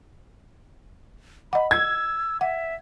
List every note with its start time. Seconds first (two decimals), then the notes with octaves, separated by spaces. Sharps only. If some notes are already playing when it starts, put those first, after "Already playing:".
1.53 D#5 F#5 B5
1.71 E6 G#6
2.41 E5 F#5